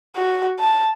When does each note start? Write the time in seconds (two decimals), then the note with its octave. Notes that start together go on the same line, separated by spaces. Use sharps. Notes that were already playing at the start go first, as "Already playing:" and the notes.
0.16 F#4
0.60 A5